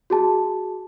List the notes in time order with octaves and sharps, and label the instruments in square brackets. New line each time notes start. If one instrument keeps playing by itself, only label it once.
[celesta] F#4 G#4 A5